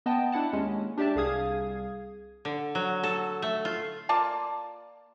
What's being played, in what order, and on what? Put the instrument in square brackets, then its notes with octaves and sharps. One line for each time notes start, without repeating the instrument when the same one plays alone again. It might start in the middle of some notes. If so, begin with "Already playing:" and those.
[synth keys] B3 D#5 G5 A5
D4 E4 F#5 A5
D#2 G#3 C#4
D4 G4 D5 E5 A5
C2 G#4 F5 D#6 G#6
[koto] D3
F#3
A4
A3
F4
[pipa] A#3 F4 D5 A5